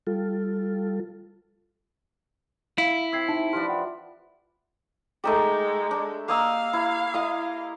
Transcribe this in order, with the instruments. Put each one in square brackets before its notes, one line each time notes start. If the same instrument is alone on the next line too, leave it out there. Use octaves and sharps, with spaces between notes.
[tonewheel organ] G3 F4 A4
[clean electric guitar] E4 [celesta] F5
[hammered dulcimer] C3 [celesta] E6 G#6 C7
[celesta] D#4 E5 A5
[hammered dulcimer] E3 F3 D4 [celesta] G4 C6 F6
[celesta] F#5 G5
[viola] G#3 [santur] A3 D#4 G4
[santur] D4
[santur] A#3 D#5 E6 [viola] F5
[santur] E4
E4 D#5 D#6